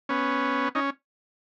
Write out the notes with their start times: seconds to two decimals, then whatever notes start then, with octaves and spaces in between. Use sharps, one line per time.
0.09 B3 C#4
0.75 C#4 D#4